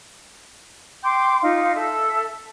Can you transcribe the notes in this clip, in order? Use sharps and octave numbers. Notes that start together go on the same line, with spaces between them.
G5 C6 D6 G6
D#4 F4 F5
A4 E5